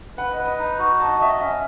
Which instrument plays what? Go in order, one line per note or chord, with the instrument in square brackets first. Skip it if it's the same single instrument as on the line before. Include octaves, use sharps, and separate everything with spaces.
[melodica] B4 [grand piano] F#5
[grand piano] D#5
[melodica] B4
[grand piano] D#5
[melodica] D#4
F#4
[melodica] D#5 [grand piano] A5
[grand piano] A5
[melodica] D#5 [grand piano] E5
[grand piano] F#5
[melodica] C#4 [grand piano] E5